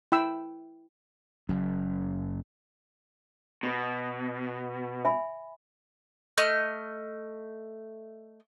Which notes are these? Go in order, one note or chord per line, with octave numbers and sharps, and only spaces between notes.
E4 G5 B5 E6
F#1 F#2
B2
E5 G#5 B5
A3 D#5 F6